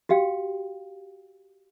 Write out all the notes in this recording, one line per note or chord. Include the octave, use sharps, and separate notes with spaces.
F#4 G4 F5 G5